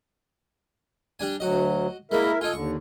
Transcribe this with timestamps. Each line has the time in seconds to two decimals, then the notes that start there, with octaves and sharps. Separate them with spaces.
1.19 G3 D4 G#5
1.40 D2 F#3 F#4 D#5
2.11 G#3 A#3 E4 A#4 E5
2.41 D#4 F4 A4 G#5
2.53 D#2 D3 C#6